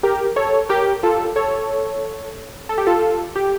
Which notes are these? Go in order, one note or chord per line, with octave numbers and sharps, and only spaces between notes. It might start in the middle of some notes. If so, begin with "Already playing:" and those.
G4 A#4
A4 C#5
G4 A#4
F4 A4
A4 C#5
A4
G4
F4 A4
G4